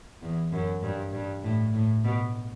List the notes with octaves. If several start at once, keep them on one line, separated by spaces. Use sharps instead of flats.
E2
F#2
G2
G2
A2
A2
B2